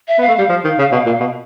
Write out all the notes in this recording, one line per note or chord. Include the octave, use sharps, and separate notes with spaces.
E5
B3
F5
A3
G3 F5
F3
D#3
C#3
B2
A#2
B2